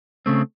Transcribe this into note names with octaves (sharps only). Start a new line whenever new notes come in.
C#3 A3 C4